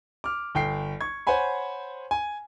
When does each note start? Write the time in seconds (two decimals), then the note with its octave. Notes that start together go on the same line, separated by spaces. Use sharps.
0.24 D6 F6
0.55 G1 G5 C7
1.01 C#6 G#6
1.27 C5 C#5 F#5 G#5 B5
2.11 G#5